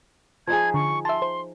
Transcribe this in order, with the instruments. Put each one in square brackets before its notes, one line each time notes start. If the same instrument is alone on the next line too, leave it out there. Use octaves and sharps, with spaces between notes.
[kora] F3 D#4 G#4 [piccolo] G#6
[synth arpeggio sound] D3 [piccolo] C#6
[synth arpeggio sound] E5 A5 [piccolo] C6
[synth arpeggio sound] C5